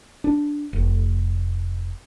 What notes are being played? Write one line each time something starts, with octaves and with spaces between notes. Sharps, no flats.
D4
F1